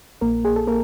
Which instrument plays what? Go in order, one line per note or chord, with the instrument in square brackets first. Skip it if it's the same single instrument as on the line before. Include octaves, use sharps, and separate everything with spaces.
[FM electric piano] A#1 A#3 A#4
G#4
A4
A#3 A#4